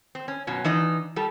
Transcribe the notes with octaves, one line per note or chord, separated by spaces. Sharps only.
C4
C#4
F#2 B2 C#4
E3 D4 D#4 D#5
G3 A4